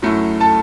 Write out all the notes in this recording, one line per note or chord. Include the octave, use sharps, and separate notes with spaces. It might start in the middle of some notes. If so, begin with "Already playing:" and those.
F#2 F#3 A3 E4
A4 A5